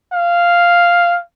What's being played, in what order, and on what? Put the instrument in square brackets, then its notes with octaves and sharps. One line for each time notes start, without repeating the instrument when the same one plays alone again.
[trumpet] F5